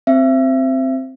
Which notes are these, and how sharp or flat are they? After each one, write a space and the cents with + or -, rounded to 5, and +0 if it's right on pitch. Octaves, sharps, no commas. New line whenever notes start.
C4 +0 E5 +30